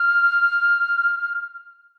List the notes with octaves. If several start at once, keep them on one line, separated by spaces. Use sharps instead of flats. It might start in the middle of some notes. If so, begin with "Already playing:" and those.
Already playing: F6